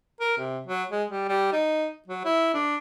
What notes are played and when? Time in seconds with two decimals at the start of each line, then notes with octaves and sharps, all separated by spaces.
0.20 A#4
0.38 C3
0.67 F#3
0.91 G#3
1.10 G3
1.29 G3
1.53 D#4
2.08 F#3
2.25 E4
2.54 D4